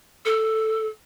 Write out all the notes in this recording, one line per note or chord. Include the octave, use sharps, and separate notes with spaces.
A4